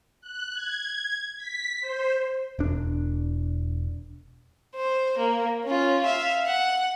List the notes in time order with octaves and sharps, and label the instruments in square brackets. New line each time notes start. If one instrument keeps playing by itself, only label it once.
[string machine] F#6
G#6
B6
C5
[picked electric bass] E1 D4
[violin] C5
A#3
C#4 F4
E5 F5
F#5